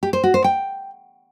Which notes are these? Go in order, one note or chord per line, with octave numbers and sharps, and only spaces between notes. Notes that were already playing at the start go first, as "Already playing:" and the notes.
G4
C5
F#4
C5
G5